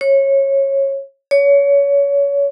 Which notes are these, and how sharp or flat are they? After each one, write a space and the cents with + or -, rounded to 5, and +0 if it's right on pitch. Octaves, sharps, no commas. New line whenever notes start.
C#5 -20
C#5 +25